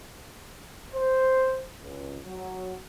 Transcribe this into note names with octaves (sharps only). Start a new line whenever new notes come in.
C5
C#2
F#3